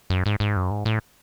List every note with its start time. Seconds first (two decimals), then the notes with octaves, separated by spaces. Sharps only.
0.10 F#2
0.26 G#2
0.40 G#2
0.56 F#2
0.71 G#2
0.85 A2